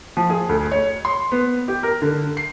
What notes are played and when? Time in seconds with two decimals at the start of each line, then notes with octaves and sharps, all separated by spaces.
0.17 F3
0.30 G#4
0.49 D2
0.71 C#5
1.05 C6
1.32 B3
1.68 G4
1.83 A#4
2.02 D3
2.37 C7